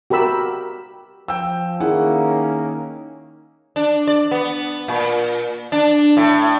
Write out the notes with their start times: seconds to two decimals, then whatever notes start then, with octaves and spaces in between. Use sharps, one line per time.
0.10 F#4 G4 A#4 B5 E6
1.28 F3 G5 E6
1.80 D#3 A#3 C#4 E4 G#4 F#5
3.76 D4
4.07 D5
4.31 B3
4.88 A#2
5.72 D4
6.17 A2